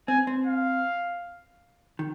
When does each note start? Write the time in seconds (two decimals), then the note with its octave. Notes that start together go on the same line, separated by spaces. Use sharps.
0.08 C4 G#5
0.27 C4
0.47 F5
1.99 D#3